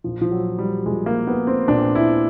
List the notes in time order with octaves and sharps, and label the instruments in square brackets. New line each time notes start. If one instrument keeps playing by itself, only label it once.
[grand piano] A#1 A#2 F3
F3
F#3
G3
A#1 A#2 F3 G#3
A#3
B3
C4
A#1 A#2 F3 D4
E4